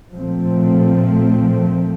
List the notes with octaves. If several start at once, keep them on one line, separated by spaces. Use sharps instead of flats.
A#2 F3 A3 C4